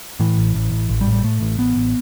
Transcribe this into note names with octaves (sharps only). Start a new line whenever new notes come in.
A2 E3
A1
A1
A1
A1
G3
A2
G3
A2 A3
A1
A1 B3
A1